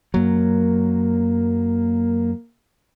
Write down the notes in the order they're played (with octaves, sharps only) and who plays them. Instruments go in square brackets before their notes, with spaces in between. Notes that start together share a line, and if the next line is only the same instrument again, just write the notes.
[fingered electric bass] F#2 F#3 [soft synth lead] A#3